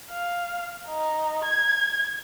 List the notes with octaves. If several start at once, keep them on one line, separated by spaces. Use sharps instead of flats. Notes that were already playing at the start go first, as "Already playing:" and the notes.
F5
D#4
G#6